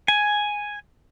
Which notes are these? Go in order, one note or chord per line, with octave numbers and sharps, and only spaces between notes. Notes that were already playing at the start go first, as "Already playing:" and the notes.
G#5